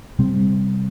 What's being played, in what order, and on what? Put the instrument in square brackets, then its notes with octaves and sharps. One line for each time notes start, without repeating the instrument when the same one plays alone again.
[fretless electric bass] C3 G3 C4